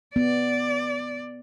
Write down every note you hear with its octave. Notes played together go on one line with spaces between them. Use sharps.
B3 D5